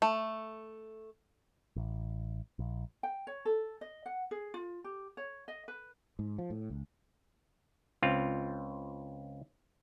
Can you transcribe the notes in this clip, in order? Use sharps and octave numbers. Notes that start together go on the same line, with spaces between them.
A3
A1
A#1
G5
C#5
A4
D#5
F#5
G#4
F4
G4
C#5
D#5
B4
G#2
F3
A2
C#2
C#2 C4 F4